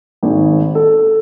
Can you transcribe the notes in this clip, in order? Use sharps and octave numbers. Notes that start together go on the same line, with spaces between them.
G#1 G#2
A4